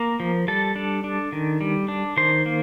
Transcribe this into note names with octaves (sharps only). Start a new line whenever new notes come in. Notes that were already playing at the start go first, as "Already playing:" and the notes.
Already playing: A#3 A#4 A#5
F3
G3 A4 A5
D4
D4
D#3
G3
D4
D#3 C5 C6
A#3